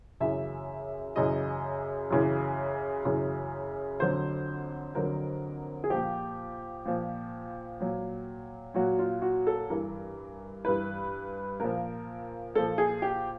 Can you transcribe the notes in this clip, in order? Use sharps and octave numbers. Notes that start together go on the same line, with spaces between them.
F#2 C#3 E3 E5
F#2 C#3 E3 D#5
F#2 C#3 E3
F#2 C#3 E3
F2 D3 F#3 C5
F2 D3 F#3 A#4
G#4
A#2 F3 G4
A#2 F3
A#2 F#3
A#2 F#3 F#4
F4
F#4
A4
G2 E3 A#4
G2 E3 B4
A#2 F3 A#4
A#2 F3 A4
G#4
G4